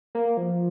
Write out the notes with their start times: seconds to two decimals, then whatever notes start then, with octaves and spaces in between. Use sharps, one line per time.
0.15 A#3
0.37 F3